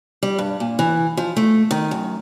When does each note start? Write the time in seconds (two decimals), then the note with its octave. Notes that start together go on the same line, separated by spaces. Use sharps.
0.23 G3
0.39 G2
0.60 A#2
0.79 E3
1.17 F3
1.36 A3
1.71 D#3
1.91 F#2